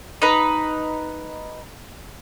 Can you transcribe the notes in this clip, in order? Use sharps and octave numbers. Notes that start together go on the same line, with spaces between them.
D#4 B4